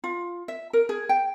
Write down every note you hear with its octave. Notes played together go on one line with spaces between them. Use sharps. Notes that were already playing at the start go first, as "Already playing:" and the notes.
F4
E5
A#4
G#4
G5